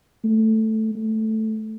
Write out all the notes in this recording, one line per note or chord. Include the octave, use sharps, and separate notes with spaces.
A3
A3